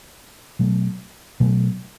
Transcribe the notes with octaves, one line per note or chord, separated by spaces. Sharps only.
B2 F#3 A3
B2 F#3 A3